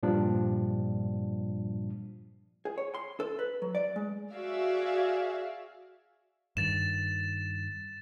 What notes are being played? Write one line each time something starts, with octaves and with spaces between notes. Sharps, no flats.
G2 A#2 F3 G3 D4
G#4
C#5
C6
A4
B4
F#3
D5
G#3
F#4 G#4 D5 E5 F5
G2 D#3 A6 E7